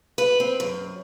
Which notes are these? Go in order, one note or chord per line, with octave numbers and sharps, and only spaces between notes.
B4
C4
F#2